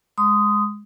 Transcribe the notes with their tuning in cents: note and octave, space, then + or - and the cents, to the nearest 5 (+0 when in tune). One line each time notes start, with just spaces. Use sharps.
G#3 +0 C6 -25 D#6 +0